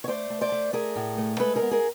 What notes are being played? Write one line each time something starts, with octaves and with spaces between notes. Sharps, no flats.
C#5
A3 C5 D5
A3
C5 D5
A3
A3 G#4 A#4
A2
A3
G#3 A4 B4
G#4 A#4
B3
G#4 A#4